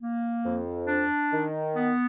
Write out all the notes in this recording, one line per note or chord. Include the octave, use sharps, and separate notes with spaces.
A#3
F2
D4
D#3
B3